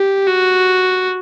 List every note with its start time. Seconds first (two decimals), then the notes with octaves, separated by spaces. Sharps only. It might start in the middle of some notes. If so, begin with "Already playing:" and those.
Already playing: G4
0.27 F#4